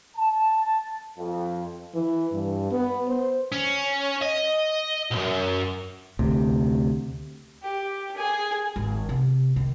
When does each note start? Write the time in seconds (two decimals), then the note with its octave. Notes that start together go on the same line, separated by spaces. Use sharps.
0.17 A5
1.19 F2
1.94 E3
2.33 G2
2.71 B3
3.08 C5
3.52 C#4
4.21 D#5
5.11 B1 F#2
6.19 D2 C3
7.63 G4
8.17 G#4
8.76 G#1
9.09 C3
9.56 D#3